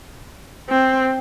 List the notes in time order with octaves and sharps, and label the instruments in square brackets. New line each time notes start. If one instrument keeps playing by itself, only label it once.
[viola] C4